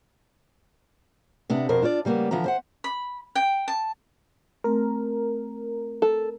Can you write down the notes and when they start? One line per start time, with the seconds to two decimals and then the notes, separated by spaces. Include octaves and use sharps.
1.50 C3 B3 D4
1.69 F2 B2 A#4 C5
1.82 D4 F4 C#5 D5
2.05 C#3 G3 A#3 B3
2.31 D3 E3 F3 B3 A#5
2.46 C5 F#5
2.84 B5
3.35 G5
3.68 A5
4.64 A3 C4 A#4
6.02 A4